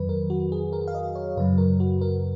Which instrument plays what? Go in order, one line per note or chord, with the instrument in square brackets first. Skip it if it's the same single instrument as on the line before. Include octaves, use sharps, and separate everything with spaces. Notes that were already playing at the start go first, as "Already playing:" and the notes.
Already playing: [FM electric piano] F2 D#3 F#3 B4
A#4
F#4
G#4
A#4
F5
D#5
C#5
F#2 C#3 F#3 B4
A#4
F#4
A#4